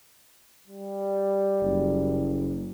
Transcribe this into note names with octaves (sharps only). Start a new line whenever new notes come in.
G3
F#1